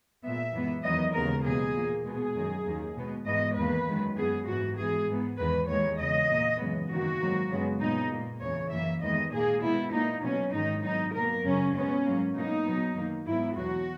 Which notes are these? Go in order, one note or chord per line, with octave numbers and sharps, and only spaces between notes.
A#2 G#3 B3 E5
F#2 E3 G#3 B3
E2 D#3 F#3 B3 D#5
D#2 C#3 G#3 B3 A#4
E2 B2 A#3 G#4
A#2 A#3
B2 G#3 B3 G#4
F#2 D#3 F#3
D#2 D#3 A#3
B2 G#3 B3
G#2 E3 G#3 B3 D#5
E2 D#3 A#3 B4
F#2 D#3 G#3
F#2 E3 G#3 B3 G#4
G#2 E3 B3 F#4
G#2 E3 B3 G#4
G#2 E3 B3
E2 D#3 G#3 B4
D#2 D#3 G#3 C#5
E2 C#3 G#3 D#5
A#2 A#3
F#2 C#3 E3 G#3 B3
F#2 D#3 A#3 F#4
G#2 D#3 F#3 A#3
F#2 C#3 G#3 B3
A#2 G#3 B3 D#4
A#2 A#3
E2 C#3 E3 C#5
F#2 E3 A#3 E5
D#2 D#3 G#3 B3 D#5
A#2 A#3 G#4
B2 G#3 B3 E4
A#2 A#3 D#4
B2 F#3 A#3 C#4
G#2 D#3 G#3 D#4
G#2 F#3 B3 D#4
B2 F#3 A#3 A#4
F#2 C#3 F#3 C#4
B2 G#3 B3 C#4
G#2 F#3 A#3
B2 F#3 A#3 D#4
B2 F#3 B3
F#2 D#3 A#3
G#2 F#3 B3 E4
E2 B2 F#3 F#4